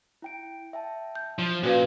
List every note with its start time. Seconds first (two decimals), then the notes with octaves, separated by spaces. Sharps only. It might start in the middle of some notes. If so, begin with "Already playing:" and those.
0.22 E4 G5 D7
0.73 E5 G5 A5
1.15 G6
1.39 F3
1.63 A#2 C#4 F#4 B4 F5